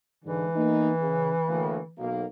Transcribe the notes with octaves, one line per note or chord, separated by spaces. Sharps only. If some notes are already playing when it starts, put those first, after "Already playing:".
G#2 D3 E3
A#3 B3 D#4
C#3
D2 A2 A#3
B1 A#3